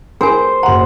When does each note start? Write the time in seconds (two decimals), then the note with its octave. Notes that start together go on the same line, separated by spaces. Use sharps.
0.21 G#4 A#4 C5 G#5
0.63 F#1 F#5 A#5 C6